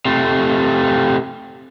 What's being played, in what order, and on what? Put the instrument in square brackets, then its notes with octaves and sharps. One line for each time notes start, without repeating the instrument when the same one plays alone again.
[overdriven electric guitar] C3 A3